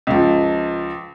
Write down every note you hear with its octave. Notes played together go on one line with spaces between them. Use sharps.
C#2 F3